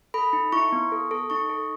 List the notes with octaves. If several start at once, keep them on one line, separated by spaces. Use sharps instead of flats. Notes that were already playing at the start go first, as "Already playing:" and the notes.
A4 B5
D#4
E4 C#6
B3
A4
A4
D#4 C#6
A4